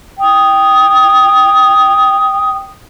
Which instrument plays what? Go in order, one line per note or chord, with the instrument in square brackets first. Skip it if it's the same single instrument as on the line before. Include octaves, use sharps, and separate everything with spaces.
[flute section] G5 D#6